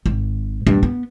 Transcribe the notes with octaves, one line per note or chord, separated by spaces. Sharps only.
G#1
G2
B3